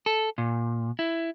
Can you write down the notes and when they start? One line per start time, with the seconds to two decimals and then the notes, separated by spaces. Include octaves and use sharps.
0.06 A4
0.38 A#2
0.99 E4